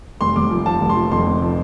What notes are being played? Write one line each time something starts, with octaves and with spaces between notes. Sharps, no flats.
F1 C6
F1 D6
F3
F3 A5
F1
C6
F3
F2 C6
F1
F3